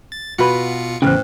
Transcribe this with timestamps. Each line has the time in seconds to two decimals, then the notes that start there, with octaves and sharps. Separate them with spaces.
0.12 A6
0.38 B2 F4 F#4 B4 C#7
1.02 E2 A2 C#3 C#4 B4 C5